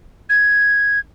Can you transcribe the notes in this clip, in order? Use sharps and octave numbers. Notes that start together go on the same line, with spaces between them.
G#6